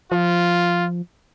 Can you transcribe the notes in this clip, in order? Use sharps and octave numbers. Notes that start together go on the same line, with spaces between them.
F3 F4